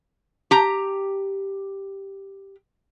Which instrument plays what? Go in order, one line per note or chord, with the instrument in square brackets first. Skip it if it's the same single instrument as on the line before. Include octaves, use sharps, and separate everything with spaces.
[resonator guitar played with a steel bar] G4 A#5